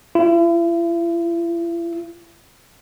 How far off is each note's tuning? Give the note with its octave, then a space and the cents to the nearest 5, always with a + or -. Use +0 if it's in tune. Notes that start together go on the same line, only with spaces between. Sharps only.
E4 +45